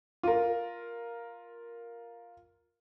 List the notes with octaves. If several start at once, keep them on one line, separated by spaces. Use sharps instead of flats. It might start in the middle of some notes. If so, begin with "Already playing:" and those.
F4 A#4